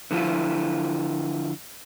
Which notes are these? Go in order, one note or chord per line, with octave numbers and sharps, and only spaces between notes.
D3 F3 E4 F4